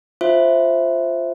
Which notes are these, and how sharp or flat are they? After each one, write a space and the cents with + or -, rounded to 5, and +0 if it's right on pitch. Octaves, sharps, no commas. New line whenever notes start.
F4 +0 C5 +0 E5 +0